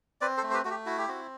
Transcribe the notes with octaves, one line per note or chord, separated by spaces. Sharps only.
C4 B4 D5
A4 C5
A3
C5
G4 B4
A3 F#4
G4
E4 F#4
G4
C4 F#4